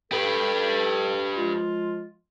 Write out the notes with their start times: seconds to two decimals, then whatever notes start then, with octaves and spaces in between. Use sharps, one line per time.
0.12 G4 A4 B4
1.36 F3 G#3 F4